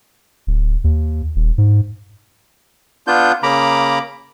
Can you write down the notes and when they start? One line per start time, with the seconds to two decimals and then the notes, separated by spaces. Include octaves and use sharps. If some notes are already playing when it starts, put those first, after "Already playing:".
0.47 D1
0.84 D#2
1.36 D#1
1.58 G#2
3.07 B3 D4 F4 G6
3.43 C#3 A#3 A#5 B5 D6